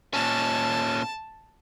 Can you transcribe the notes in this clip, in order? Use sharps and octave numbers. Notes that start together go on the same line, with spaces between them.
A#2 C#4 A5